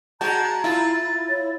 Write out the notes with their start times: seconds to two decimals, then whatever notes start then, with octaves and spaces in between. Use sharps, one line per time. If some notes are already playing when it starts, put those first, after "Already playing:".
0.21 G#3 F#4 A5 A#5 G6
0.64 E4 F4 A6
1.29 C#5